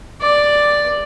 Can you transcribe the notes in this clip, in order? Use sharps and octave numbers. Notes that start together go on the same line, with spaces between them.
D5